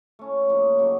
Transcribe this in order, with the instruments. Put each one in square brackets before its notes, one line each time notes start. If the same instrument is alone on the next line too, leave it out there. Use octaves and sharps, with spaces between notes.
[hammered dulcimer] A3 C#4 E4
C#3 F3 A#3 D#4
C#3 F#3 A3